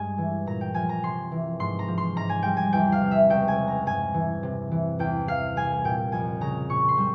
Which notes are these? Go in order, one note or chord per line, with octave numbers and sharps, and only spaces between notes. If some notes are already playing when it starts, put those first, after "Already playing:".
Already playing: G2 G#3 G#5
E3
A#2 A#5
G5
F3 G#5
A#5
C3 C6
E3
G#2 C6
A#5
F3
C6
G#2 A#5
G#5
G3 G5
G#5
E2 G5
F5
C3
E5
C#2 G5
G#5
C3
A#5
G2 G#5
E3
C3
E3
E2 G5
E3 F5
C2 G#5
A#2 G5
F2 G#5
C#3 A#5
A#2 C#6
C6
G3